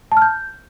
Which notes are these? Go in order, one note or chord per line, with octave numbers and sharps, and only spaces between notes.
A5
F6
G6